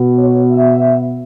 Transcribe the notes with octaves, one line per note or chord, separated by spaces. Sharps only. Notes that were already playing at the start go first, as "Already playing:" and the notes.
Already playing: B2 B3
C#5
E5